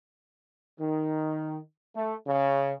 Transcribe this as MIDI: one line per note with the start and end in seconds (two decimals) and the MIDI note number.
0.80 1.59 51
1.95 2.15 57
2.28 2.73 49